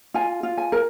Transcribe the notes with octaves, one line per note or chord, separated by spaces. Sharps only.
F4 G#5
F4
G#5
A#4